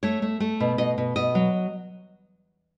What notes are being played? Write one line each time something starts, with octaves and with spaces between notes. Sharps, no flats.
A3 C#5
A3
A3
B2
B2 D#5
B2
B2 D#5
F#3